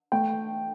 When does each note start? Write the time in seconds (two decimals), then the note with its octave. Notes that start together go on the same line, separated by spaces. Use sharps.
0.12 A3 G5